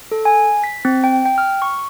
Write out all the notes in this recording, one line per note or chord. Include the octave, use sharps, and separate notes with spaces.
A4
G#5
B6
C4
G5
G5
F6
C#6